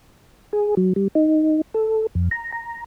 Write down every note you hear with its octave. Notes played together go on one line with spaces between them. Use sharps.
G#4
F#3
G3
D#4
A4
F2
A#5
A#5